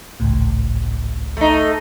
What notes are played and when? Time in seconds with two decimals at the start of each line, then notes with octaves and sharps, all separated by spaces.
0.20 G#1 C#2 A2
1.37 A3 D#4